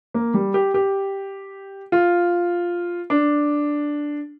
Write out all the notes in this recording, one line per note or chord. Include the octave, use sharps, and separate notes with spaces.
A#3
G3
G4
G4
F4
D4